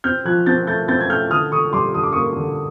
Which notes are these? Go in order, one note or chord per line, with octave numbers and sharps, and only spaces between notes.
C4 F6 G6
F3 F#6 G#6
C4 G6 A6
A3 G6 A6
C4 G6 A6
G#6
A3 F6 G6
D3 D#6 F6
D3 C#6 D#6
G3 C6 D6
D3 D#6
D6
A#3 C#6 D#6
D3